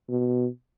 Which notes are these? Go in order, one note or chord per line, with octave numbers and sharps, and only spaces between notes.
B2